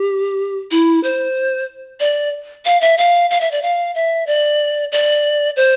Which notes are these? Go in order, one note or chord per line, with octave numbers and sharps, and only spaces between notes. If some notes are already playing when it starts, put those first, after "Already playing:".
Already playing: G4
E4
C5
D5
F5
E5
F5
F5
E5
D5
F5
E5
D5
D5
C5